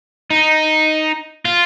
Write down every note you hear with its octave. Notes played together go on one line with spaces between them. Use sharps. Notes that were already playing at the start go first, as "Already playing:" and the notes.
D#4
F4